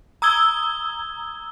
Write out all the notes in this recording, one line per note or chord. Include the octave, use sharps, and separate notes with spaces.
A#5 D#6 E6 G#6 G7